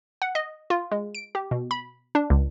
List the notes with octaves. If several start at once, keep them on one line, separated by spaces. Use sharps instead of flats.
F#5
D#5
F4
G#3
D7
G4
B2
B5
D4
C#2